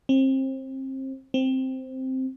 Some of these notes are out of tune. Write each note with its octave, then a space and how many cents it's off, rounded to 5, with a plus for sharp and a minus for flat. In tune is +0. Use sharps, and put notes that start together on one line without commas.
C4 +30
C4 +0